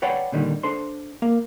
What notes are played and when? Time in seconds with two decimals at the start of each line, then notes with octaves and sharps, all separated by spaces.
0.02 B4 C#5 D5 F#5 G5 A5
0.32 A#2 D3 D#3 G3
0.63 D4 A4 C5 C6
1.22 A#3 F5